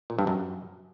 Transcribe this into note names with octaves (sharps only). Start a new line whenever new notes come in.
A#2
G2
F#2